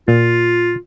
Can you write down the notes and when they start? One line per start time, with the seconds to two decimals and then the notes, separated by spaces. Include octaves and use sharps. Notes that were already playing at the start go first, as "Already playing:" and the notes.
0.08 A#2 F4